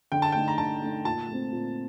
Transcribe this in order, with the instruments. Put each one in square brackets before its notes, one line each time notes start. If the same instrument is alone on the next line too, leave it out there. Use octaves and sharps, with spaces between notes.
[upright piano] D3 [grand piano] G5
[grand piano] A5
[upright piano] A3 D#4 [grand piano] G5
[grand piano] A#5
[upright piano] D3 [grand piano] A5
[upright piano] A3 D#4
[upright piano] A#2 [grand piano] A5
[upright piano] A3 C4
A#2